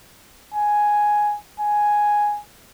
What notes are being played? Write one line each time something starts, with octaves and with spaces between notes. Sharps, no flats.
G#5
G#5